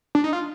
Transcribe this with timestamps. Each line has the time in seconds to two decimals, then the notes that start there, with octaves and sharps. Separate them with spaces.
0.15 D4
0.24 D#4
0.33 F4